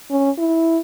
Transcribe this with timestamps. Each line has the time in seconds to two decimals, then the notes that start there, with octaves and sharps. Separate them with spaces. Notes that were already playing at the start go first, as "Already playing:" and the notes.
0.10 C#4
0.38 E4